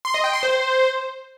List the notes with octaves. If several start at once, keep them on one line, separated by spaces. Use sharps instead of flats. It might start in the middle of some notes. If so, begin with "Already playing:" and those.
C6
D#5
G5
C6
C5